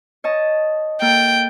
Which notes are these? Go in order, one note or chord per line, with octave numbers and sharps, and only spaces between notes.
C#5 D#5 A5
A#3 A4 G5